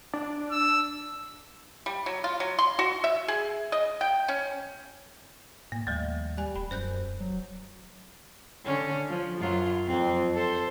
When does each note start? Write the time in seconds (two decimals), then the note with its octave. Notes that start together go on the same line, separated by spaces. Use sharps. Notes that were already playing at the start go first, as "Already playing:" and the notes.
0.14 D4
0.51 E6
1.86 G3
2.06 F#3
2.24 F4
2.40 F#3
2.59 C6
2.79 F#4
3.04 E5
3.28 G#4
3.72 D#5
4.01 G5
4.28 C#4
5.72 A2 A#3
5.87 D#2 F3 G3 A3
6.37 G3 G#5 F#6
6.56 D#1 B5
6.71 F#2 C5 F#6 G6
7.20 F#3
8.65 D3 C#4
9.09 F3
9.39 F#2 F#3 F4
9.86 F2 C4
10.34 A4 C5